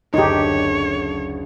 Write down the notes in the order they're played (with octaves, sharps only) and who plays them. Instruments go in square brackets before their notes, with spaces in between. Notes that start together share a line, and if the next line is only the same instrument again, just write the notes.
[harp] F#1 D2 [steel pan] D#4 G4 [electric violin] C#5